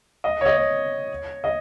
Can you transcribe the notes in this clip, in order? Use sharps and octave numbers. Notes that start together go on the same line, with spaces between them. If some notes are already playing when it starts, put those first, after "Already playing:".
D#5
C#5
D#5
C#5
D#5